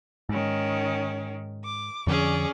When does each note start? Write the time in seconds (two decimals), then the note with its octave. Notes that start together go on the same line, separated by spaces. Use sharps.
0.29 G#2 D#3 C#4
1.63 D6
2.07 F2 D3 F3 C#4 G#4 D5